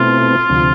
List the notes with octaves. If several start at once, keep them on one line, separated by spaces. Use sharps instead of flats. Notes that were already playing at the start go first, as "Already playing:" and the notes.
Already playing: B2 A3 C4 E4 F4
D2 C3 F3